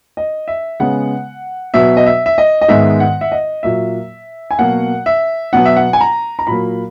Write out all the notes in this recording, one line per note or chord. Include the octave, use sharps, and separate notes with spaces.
D#5
E5
C#3 G#3 B3 F#5
B2 F#3 B3 E5
D#5
E5
E5
D#5
D#5
G#2 D#3 G#3 B3 E5
F#5
E5
D#5
A#2 F#3 A#3 E5
G#5
B2 F#3 A#3 F#5
E5
B2 F#3 B3 F#5
E5
F#5
G#5
A#5
A#5
A#2 F#3 A#3 B5